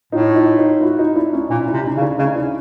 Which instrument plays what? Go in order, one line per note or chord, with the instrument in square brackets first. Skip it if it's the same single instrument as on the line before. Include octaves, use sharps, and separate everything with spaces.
[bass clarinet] A2 [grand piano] D#4 F4
[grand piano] D#4 F4
D#4 F4
E4 F#4
D#4 F4
D4 E4
C#4 D#4
[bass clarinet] A#2 [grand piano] D4 E4
[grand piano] D4 E4
[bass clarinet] C3
[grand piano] C#4 D#4
[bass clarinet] C#3
[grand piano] D4 E4
[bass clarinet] C#3 [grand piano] C#4 D#4
[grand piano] D4 E4